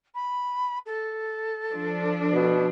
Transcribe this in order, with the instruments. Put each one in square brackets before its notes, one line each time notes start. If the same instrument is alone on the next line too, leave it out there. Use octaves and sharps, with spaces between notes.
[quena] B5
A4
[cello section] F3 D4
[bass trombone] B2